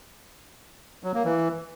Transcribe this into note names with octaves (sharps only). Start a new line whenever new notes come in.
F#3
A#3
E3